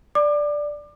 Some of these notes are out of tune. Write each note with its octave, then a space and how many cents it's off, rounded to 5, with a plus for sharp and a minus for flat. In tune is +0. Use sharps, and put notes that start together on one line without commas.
D5 +0 D6 +30